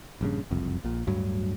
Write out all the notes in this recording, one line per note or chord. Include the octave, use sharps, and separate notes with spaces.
A#1 G2 C#3
F#1 C2 F2
A#1 A#2
D1 D2 G2 F#3